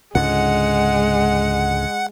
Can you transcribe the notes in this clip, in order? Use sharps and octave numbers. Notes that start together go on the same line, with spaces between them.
C#2 G#2 D3 G#3 F#5